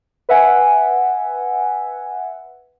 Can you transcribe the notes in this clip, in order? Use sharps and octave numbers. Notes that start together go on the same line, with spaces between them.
B4 E5 F#5 G#5